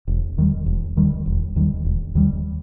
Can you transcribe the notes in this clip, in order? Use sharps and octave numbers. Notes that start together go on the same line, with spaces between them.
E1
D#2 D#3 G3
E1
D#2 D#3 G3
E1
D#2 D#3 G3
E1
D#2 D#3 G3